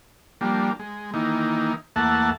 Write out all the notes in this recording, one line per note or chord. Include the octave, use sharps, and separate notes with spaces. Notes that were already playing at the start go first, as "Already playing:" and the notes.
F3 G3 A#3 D4
G#3
D#3 E3 A#3 D#4
E2 A3 A#3 E5 F#5 A5